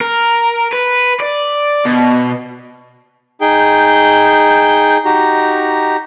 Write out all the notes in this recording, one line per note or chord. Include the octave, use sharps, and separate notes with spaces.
A#4
B4
D5
B2
D#4 G#4 G5 G6
D#4 F#4 G4 A#5